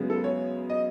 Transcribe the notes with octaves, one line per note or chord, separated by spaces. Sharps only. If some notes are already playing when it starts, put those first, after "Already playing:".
Already playing: F#2 C#3 G#3 B3
A4
C#5
D#5